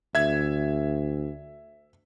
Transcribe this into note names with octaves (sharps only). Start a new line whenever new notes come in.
D2 E5 G#6